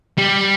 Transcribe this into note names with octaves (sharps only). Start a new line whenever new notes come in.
G3